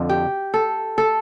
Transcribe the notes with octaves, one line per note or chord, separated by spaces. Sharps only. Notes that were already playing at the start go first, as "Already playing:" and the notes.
Already playing: F2 D3 F3
G4
A4
A4